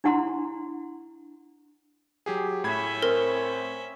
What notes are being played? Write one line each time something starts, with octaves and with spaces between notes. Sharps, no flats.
D4 E4 F#5 A#5 C6
F#3 G4 G#4
A2 C#4 E5 B5 G#6
C4 A#4